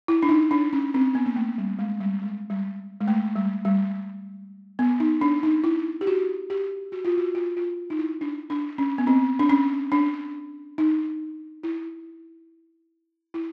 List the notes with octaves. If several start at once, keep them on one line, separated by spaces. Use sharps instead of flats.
E4
D4
D#4
D4
C#4
C4
B3
A#3
A3
G3
G#3
G3
G#3
G3
G#3
A3
G3
G3
B3
D#4
D4
D#4
E4
G4
F#4
G4
F#4
F4
F#4
F4
F4
D#4
E4
D4
D4
C#4
B3
C4
D4
C#4
D4
D#4
E4
E4